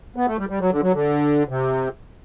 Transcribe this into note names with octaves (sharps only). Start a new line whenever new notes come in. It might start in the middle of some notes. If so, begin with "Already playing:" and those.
B3
A3
G3
G3
F#3
D3
F#3
D3
C3